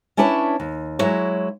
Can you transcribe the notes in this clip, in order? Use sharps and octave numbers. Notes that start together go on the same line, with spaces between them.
C#4 D4 E4 B4 C#5 A5
D#2
F#3 G#3 E4 C#5